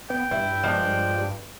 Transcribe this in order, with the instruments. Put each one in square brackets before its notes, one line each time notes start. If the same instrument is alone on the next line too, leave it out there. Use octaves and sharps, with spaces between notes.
[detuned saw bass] B3 [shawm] G5
[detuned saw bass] G2 [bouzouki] E4
[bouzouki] F3 G#3 D4